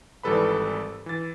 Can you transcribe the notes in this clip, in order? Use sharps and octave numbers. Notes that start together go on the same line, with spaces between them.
G#1 E3 G3 A4 B4 B5
E3 A6